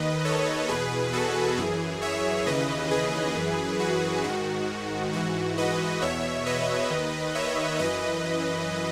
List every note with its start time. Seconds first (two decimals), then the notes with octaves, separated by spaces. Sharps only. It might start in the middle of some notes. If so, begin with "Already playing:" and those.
Already playing: D#2 D#3 B4 D#5
0.25 A4 C#5
0.69 E2 B2 G#4 B4
1.13 F#4 A4
1.58 F#2 E3 G#4
2.01 C#5 E5
2.46 D#2 C#3 E3 B4 D#5
2.91 G#4 B4
3.35 F#2 E3
3.80 F#4
4.24 G#2 D#3 F#4
5.13 G#2 E3 F#4
5.58 B4 D#5
6.02 E2 B2 C#5 E5
6.46 B4 D#5
6.90 D#2 D#3
7.35 C#5 E5
7.79 F#2 E3 B4 D#5